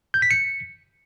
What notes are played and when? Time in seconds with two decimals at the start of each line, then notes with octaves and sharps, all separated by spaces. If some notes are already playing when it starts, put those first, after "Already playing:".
0.14 G6
0.22 B6
0.31 C#7